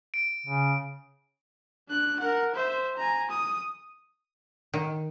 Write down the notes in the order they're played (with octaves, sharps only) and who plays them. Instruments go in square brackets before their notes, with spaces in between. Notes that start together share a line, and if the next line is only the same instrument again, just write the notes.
[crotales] D7
[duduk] C#3
[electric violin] D4 F#6
A#4 F#5
C5 E5
G#5 A#5
D#6
[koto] D#3